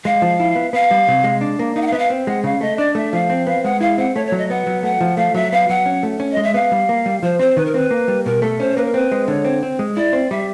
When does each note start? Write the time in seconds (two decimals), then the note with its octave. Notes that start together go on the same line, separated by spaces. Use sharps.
0.05 G#3 F5
0.22 F3
0.40 E4
0.56 B3
0.73 B3 F5
0.91 G3
1.08 C3
1.24 G#3
1.41 D4
1.59 A#3
1.76 D#4 F5
1.81 F#5
1.87 F5
1.92 B3 E5
1.99 F5
2.10 C4
2.27 G#3 F#5
2.44 C#3 F5
2.61 A3 D#5
2.78 D4 D5
2.95 A3 E5
3.13 F3 F5
3.30 C4
3.47 B3 F5
3.64 G#3 F#5
3.81 E4 F5
3.98 C4 F#5
4.15 A3 C#5
4.27 C#5
4.32 F#3
4.38 D#5
4.50 B3 F#5
4.67 F#3
4.83 A3 F#5
5.01 F3
5.17 A3 F5
5.34 F#3 E5
5.52 B3 F5
5.69 F#3 F#5
5.86 C#4
6.03 A3
6.20 C#4
6.32 D#5
6.37 G#3
6.43 E5
6.54 B3 F5
6.72 G3
6.89 A#3
7.06 G3
7.23 F3 C5
7.39 C4 C5
7.57 D#3 B4
7.66 A#4
7.74 C4 B4
7.91 A#3
8.08 G3
8.25 B2 A#4
8.42 A3 A4
8.60 C#4 C5
8.77 A#3 B4
8.85 A#4
8.94 C4 B4
9.12 G#3
9.28 D3 C#5
9.45 C4
9.63 C4
9.79 G#3
9.97 E4 D5
10.13 C4
10.30 G3 E5